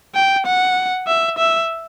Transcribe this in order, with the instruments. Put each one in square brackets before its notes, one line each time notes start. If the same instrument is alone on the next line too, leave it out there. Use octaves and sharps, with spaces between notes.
[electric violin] G5
F#5
E5
E5